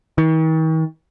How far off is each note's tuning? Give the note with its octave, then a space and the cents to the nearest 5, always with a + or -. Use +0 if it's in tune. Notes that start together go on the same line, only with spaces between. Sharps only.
D#3 +45